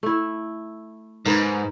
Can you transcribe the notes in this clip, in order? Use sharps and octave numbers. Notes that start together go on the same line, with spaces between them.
A3 E4
G#2 D#4 A#4 B4